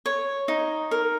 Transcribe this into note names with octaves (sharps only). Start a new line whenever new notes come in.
C#5
D#4
A#4